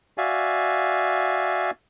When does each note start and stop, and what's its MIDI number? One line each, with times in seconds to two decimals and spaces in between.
0.18 1.71 66
0.18 1.71 74
0.18 1.71 76
0.18 1.71 77
0.18 1.71 80